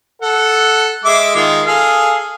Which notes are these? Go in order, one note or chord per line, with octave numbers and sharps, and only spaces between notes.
A4 F#5
G#3 E5 D6
D#3 G#3 F4
G#4 A4 F5